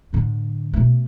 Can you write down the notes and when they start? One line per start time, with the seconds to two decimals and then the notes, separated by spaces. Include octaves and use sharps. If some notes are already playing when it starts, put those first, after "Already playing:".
0.13 A2 D3
0.73 B2 A3